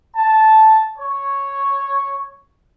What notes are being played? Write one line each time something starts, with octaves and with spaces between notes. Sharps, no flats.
A5
C#5